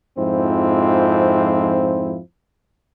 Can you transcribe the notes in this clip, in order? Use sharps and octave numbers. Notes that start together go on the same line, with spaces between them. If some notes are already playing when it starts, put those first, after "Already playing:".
F2 G#2 F3 C4 E4 C5